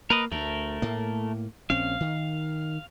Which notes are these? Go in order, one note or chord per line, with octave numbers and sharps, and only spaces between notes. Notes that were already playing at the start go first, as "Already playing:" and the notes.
A#3 A#4 B4 D#5
D2 A3 A#4
A2 A#3
A#1 C4 C#4 F5
D#3